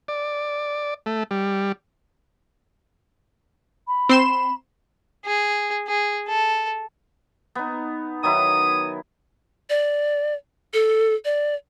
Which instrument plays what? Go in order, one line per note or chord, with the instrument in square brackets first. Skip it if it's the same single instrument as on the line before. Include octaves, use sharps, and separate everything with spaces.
[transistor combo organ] D5
A3
G3
[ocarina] B5
[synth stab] C4 C6 E7
[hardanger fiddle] G#4
G#4
A4
[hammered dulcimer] B3 D#4
[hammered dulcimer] D#3 F#3 E4 [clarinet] D#6
[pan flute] D5
A4
D5